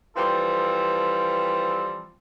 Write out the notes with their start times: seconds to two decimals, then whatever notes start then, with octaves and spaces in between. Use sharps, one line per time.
0.16 E3 F3 G3 C4 A4